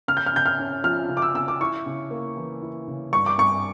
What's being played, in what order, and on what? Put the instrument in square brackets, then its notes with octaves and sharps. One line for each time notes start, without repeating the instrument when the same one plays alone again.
[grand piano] C#3 [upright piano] F6
[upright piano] G6
F6
[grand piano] C#3 [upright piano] G6
[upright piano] F6
[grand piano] C#4
[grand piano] F3 [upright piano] F6
[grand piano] C#3
[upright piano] D6
E6
[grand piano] C#3 [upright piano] E6
[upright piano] D6
[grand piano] E4 [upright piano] C#6
[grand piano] C#3
A#3
E3
E4
C#3
[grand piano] G2 [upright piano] C#6
[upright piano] D6
[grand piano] G2 [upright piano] C#6